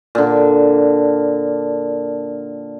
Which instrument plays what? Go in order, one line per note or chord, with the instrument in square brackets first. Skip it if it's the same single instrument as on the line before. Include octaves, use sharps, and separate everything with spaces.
[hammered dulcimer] A#2 D3